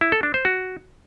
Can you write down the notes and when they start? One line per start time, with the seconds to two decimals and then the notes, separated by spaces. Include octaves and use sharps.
0.01 E4
0.12 A4
0.23 D4
0.34 C5
0.45 F#4